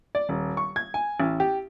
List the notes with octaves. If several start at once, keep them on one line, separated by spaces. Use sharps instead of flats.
D5
D#1
C#6
G#6
G#5
A1
G4